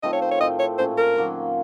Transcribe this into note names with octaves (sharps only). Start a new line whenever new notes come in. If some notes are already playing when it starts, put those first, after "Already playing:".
D#3 A3 C4 F4 D#5
C#5
C5
C#5
A2 A3 C4 D#5
C#5
A#2 A3 C#4 C5
A#4
D#3 F#3 A#3 F4